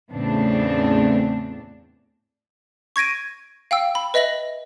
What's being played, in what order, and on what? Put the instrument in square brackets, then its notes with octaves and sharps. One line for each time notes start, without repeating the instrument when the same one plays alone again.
[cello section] E2 A2 C#3 B3 C4 D4
[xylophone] C#6 G#6 A#6 D7 D#7
F5 G5 E6
B5
B4 D#5 E5 A#6 F#7